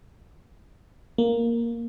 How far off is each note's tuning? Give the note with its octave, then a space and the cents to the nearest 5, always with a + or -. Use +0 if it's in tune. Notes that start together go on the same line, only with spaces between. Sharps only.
A#3 +0